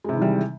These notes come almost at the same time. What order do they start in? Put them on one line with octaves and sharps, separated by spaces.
G#3 C3 E3 D#3 G3